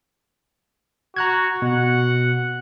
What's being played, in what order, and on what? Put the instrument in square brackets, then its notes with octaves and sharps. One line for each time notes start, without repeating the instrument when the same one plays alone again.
[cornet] F#4 [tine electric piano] A#5 F#6 G#6
[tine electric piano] B2 [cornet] F#5